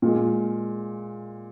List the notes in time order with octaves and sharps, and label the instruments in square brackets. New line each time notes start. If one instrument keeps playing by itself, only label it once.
[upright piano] A#2 G#3